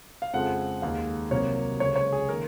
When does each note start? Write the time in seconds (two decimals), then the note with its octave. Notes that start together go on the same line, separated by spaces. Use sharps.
0.22 F5
0.33 F2 C#3 F3 G#3 F#5
0.82 D#2 D#3 G#3 F5
1.31 C2 C3 F#3 A#3 C#5
1.80 C#2 C#3 G#3 C#5
1.96 C#5
2.13 G#4
2.29 D#3 A#3 A#4